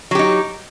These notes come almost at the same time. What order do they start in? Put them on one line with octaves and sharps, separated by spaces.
F#3 G4 D#4